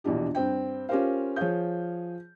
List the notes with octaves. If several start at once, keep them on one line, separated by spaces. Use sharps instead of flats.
A#1 E2 B2 E3 D4 G4
G2 C4 G5
C#4 F4 G4 A#4 C5 F5
F3 G#4 C#5 F5 G6